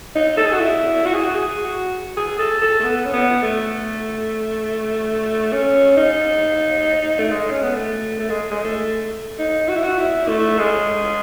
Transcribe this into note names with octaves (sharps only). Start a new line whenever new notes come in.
D#4
A4
G#4
F#4
E4
F#4
G#4
F#4
G#4
F#4
G#4
A4
A4
A3
B3
C#4
B3
A3
C#4
D#4
A3
G#3
C#4
B3
A3
A3
G#3
G#3
A3
D#4
F#4
E4
F#4
E4
A3
G#3